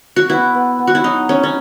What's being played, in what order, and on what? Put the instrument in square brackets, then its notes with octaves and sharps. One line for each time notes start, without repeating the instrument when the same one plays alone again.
[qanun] F#4
[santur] B3 [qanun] E4
[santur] B3
B3
[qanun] F#4
E4
[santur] F#3 [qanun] D#4
[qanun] C#4 [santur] E4
[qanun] C#4